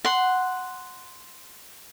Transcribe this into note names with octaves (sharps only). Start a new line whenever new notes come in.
F#5 C6